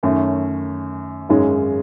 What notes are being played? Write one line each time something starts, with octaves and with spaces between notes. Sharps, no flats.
F#2 D#3 A3 C#4
G#1 F#2 D#3 G#3 C#4